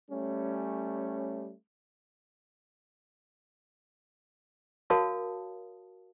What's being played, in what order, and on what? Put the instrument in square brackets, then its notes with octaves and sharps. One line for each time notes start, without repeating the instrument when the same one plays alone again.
[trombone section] G3 A3 C#4
[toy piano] F#4 A#4 C#5 F5 A5 D#6